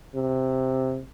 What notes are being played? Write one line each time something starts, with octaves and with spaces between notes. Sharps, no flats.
C3